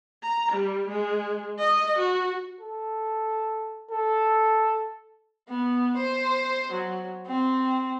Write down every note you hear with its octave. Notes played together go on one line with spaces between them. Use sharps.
A#5
G3
G#3
D#5
F#4
A4
A4
B3
C5
F#3
C4